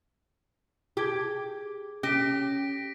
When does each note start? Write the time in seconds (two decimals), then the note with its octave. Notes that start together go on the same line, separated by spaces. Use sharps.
0.97 G4 G#4 D6 G#6
2.03 C#4 G4 A#6 B6 D7